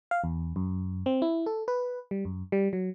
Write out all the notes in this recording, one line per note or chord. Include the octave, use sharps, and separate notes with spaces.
F5
E2
F#2
C4
E4
A4
B4
G3
F#2
G3
F#3